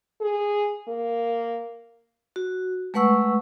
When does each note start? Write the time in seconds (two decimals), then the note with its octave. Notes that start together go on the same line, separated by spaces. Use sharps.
0.21 G#4
0.88 A#3
2.36 F#4
2.94 G#3 A3 B4 F#5 C#6 E6